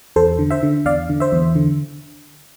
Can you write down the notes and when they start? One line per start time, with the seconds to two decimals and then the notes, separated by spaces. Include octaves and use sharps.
0.16 E2 A4 C5
0.39 D3
0.50 C5 E5
0.63 D3
0.85 E2 D5 F5
1.09 D3
1.20 C5 E5
1.32 E2
1.55 D3